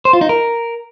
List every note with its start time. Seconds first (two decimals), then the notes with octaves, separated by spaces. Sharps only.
0.05 C5
0.13 F4
0.21 D#4
0.29 A#4